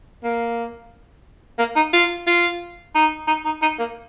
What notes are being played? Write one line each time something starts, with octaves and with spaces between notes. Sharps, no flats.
A#3
A#3
D#4
F4
F4
D#4
D#4
D#4
D#4
A#3